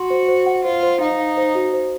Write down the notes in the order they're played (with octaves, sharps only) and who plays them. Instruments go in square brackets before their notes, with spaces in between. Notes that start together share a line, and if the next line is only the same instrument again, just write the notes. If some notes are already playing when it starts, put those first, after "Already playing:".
Already playing: [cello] F#4 [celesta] C6
[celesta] C5
C5
F#5
[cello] F4 [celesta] C5
[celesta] C5
[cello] D#4 [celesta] F5
[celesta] F5
C5
F#4
C5